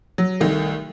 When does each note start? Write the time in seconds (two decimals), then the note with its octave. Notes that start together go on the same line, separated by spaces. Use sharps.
0.18 F#3
0.40 C2 D#3 A3